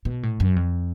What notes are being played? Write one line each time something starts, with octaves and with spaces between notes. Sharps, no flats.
B2
A2
F#2
F2